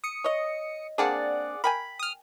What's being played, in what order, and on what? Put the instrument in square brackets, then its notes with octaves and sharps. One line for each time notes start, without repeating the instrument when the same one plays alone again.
[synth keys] D#6 C#7
[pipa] C#5 D#5
[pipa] A#3 C4 D4 [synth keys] G#4 D5 F#5
[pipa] A#4 G5 G#5 [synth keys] B5
[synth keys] D#6 F6